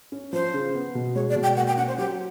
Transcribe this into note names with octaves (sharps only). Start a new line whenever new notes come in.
C#4
F3 C5
C#3
B3
B2
G#3 C#5
D5
B2
G5
A#3 F#5
G5
C#4 F#5
C5
F#3 G4